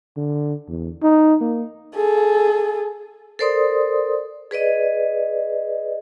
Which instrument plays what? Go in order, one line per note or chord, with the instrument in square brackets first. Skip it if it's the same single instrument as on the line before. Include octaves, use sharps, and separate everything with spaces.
[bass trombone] D3
E2
D#4
A#3
[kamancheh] G#4 A4
[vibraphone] A4 A#4 C5 D5 C6 D#6
G#4 B4 D5 D#5